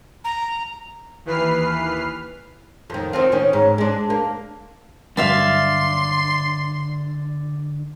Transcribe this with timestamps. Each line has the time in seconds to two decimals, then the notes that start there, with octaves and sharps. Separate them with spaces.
0.24 A#5
1.25 D#2 E3 B4 F6 C7
2.90 F2 D#3
3.13 D#3 C4 F4
3.32 D#3 C#4
3.53 G#2
3.78 G#3 D4
4.10 A#3
5.17 G2 D3 F#3 G3 D5 E5 F5 C6